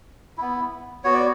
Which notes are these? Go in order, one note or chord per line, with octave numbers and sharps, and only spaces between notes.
B3 E4
B3 F#4 C#5
D5